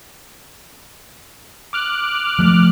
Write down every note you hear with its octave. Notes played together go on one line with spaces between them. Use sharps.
D6 F6 F#6
F3 A3